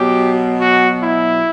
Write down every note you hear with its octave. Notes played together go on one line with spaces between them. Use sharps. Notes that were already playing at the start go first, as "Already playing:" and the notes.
Already playing: B2 F#3 G4
F#4
E4